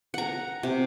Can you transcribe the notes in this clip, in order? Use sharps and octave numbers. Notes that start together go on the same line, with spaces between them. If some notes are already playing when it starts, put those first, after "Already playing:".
F#5 A#5
C3